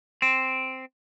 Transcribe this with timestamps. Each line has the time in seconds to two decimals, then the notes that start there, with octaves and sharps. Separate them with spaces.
0.22 C4